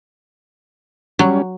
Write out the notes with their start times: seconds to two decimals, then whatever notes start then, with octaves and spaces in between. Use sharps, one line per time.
1.19 F#3 G3 C#4